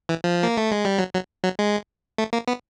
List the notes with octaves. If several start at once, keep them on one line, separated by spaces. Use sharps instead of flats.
E3
F3
A#3
A3
G#3
G3
F#3
F#3
F#3
G#3
A3
A#3
B3